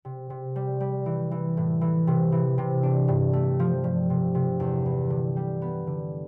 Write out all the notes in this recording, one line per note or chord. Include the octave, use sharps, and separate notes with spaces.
C3
C3
G3
G3
E3
E3
A2
E3
C3
E3
C3
D4
G2
A3
F3
G2
C3
C3
E2
E3
D3
G3
B3
D3